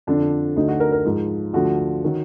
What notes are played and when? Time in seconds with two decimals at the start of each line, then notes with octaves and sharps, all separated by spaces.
0.07 F2 D3 F3 D4
0.56 D2 D3 F#3 D#4
0.68 F#4
0.80 A#4
0.92 A#4
1.05 G#2 F3
1.53 D2 D3 F3 F#4
2.04 D#3 F#3